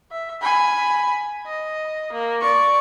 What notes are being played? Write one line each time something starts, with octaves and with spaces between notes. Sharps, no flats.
E5
G#5 B5
D#5
A#3
D5 C#6